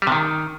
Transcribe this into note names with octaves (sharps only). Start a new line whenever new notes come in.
G3
C3
D#3